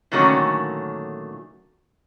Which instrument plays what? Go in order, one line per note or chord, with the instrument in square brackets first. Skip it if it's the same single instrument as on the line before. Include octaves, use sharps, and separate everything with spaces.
[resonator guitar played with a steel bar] A#2 D3 D#3 F#3 A3 C#4